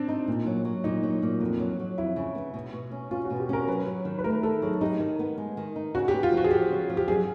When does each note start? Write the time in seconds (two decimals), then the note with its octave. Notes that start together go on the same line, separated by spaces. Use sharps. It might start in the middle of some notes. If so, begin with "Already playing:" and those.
Already playing: C4 D4
0.08 D#4
0.28 A#2
0.46 F#3
0.65 F#3
0.84 A#2 D#4
1.03 F#3
1.22 A#2
1.40 F2
1.59 F#3
1.79 F#3
1.98 F2 E4
2.16 C#3
2.35 B3
2.54 B2
2.73 B2
2.92 C#4
3.11 C#4 F4
3.25 F#4
3.30 B2
3.40 G4
3.49 C#4 A#4
3.68 F#3 B4
3.87 F#3
4.05 D#3
4.19 B4
4.24 A3 A#4
4.43 D#3 A4
4.62 F#3 G#4
4.81 D#4 G4
5.00 D#3
5.19 B3
5.38 G#3
5.57 D#3
5.76 D#4
5.94 C#3 F#4
6.08 G4
6.14 B3
6.23 F4
6.32 F3
6.37 F#4
6.44 G#4
6.51 F3 G4
6.70 C#3
6.90 F3
6.97 G4
7.08 F#2 G#4